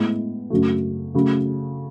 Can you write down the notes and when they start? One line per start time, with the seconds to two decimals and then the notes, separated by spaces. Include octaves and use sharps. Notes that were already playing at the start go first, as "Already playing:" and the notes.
Already playing: A2 G#3 B3 E4
0.50 F#2 C#3 F#3 A3
1.14 C#3 F#3 A3